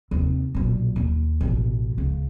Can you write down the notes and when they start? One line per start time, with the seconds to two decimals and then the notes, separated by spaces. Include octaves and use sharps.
0.11 D#2 C3
0.54 B1 A#2
0.96 D#2
1.41 A1 B2
1.98 C#2